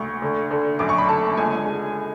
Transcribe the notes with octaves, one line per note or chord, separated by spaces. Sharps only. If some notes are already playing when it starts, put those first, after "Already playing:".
Already playing: D2 C#6
D3
D3
F#2 D6
C#6
B5
D3 A5
C#2 G#5
G#3